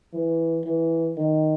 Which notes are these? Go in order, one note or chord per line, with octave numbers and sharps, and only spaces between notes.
E3
E3
D#3